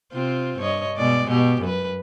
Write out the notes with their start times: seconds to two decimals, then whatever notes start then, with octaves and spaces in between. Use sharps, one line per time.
0.12 C3 C4 F4
0.58 G2 C#5 D#5
0.97 B2 G#3 D5
1.27 B2 G4
1.61 F#2 B4